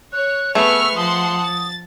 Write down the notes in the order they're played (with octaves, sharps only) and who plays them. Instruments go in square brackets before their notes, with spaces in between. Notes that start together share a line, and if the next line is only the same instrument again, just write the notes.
[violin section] C#5 [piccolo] F#6
[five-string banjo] A3 G#4 [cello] B3 B4 [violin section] C#6 F6 [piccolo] E6
[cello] F3 [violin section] F#5 A5 C6 [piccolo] D#6
[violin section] A6